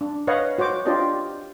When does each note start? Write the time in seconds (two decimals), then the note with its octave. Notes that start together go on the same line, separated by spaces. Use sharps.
0.01 D4
0.27 B4 C#5 D#5 F5 F#5
0.58 F#4 C5 C#5 D6
0.85 D4 F4 G4 C5 D5 D#5